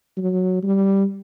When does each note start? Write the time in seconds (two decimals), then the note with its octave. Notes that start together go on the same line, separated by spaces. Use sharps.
0.17 F#3
0.63 G3